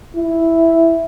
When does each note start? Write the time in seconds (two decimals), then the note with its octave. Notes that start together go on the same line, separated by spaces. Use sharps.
0.16 E4